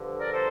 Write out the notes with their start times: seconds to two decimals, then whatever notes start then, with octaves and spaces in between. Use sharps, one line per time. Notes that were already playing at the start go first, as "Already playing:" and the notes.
Already playing: G2 D3 F3
0.18 A#4 D5
0.33 A4 C5